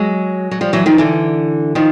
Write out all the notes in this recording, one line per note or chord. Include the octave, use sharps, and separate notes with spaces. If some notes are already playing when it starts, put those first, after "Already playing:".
Already playing: F#3 G#3
F#3
F3 G3
E3 F#3
D#3 F3
D3 E3
D#3 F3